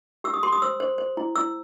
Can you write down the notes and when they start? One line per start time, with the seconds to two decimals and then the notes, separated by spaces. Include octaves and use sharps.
0.24 G4 E6
0.34 D#6
0.43 G4 C6
0.52 D#6
0.62 C5 E6
0.80 C5
0.98 C5
1.17 E4
1.36 E4 E6